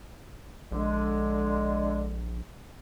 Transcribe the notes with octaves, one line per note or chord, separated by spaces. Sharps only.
A#1 D3 G#3